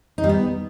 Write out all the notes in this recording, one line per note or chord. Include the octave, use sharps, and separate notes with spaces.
D#4
G3
B3